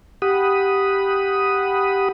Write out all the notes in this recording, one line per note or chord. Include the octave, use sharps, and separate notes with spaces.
G4 F#5 B5 D#6